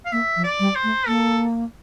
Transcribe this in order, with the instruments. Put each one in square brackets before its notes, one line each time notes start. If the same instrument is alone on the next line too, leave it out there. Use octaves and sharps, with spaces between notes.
[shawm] F5
[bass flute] A#3 [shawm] E5
[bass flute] F3
[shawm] D5
[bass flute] G3
[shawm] C5
[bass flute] A3
[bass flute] A#3 [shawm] A4